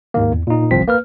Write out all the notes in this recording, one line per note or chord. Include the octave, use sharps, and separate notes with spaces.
D#2 G#2 D#3 A#3
E2
A#2 D#4
G1 C2 F3 C4 B6
A#3 B4 F6